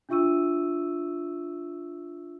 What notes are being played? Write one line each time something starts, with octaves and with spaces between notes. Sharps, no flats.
D4 F4 E5 C#6 E6 D#7